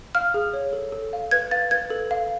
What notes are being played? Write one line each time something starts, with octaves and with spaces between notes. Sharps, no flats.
F5 F6
G#4
C#5
A4
A4
F5
B4 G#6
F5 A6
B4 G#6
A4
F5